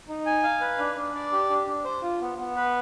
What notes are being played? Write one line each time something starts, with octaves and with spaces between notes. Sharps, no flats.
D#4
G#5
F5
B4
D4
D4
D5
G4
D4
D4
C5
F4
B3
B3
B4